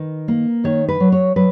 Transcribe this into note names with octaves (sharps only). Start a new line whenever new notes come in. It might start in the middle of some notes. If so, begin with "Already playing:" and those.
Already playing: D#3 B4
A#3
D#3 C#5
B4
F#3
C#5
F#3 B4